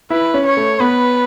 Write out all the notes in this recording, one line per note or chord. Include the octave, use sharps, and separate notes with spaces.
E4 B4
C#4
C#5
A3
B3 B4